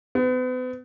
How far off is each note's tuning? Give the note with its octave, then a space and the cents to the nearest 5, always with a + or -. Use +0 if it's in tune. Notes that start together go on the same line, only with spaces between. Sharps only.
B3 +40